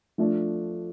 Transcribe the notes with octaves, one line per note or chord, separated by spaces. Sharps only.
F3 A3 D4